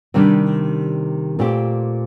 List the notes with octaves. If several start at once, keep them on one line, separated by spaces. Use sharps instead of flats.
C3 D#3 G3 D4
A#2 A3 C4 G4